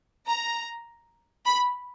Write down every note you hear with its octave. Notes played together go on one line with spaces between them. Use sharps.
A#5
B5